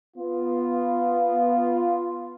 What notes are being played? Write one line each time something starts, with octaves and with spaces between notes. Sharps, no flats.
B3 F4